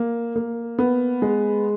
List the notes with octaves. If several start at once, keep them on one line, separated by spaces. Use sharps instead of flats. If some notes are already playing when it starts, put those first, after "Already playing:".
Already playing: A#3
A#3
B3
G#3